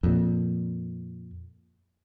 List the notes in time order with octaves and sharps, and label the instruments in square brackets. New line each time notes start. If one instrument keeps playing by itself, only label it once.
[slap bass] F2 A#2